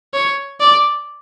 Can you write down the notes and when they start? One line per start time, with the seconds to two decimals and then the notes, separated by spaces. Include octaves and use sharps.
0.14 C#5
0.60 D5